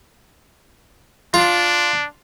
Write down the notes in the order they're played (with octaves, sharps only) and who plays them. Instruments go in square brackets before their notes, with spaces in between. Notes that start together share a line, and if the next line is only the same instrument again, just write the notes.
[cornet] D4 [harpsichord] F4